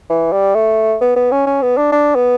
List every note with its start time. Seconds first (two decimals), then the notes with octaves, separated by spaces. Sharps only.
0.10 E3
0.33 G3
0.55 A3
1.01 B3
1.16 B3
1.32 C#4
1.47 C#4
1.62 B3
1.77 D4
1.92 D4
2.15 B3